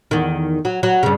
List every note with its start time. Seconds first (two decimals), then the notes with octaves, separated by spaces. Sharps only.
0.11 E2 D#3
0.65 F#3
0.83 F#3
1.03 G2 C#3